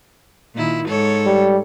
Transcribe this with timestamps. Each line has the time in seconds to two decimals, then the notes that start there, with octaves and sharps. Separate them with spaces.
0.55 A#2 D#3 E4
0.87 G#2 A4 C#5
1.26 G3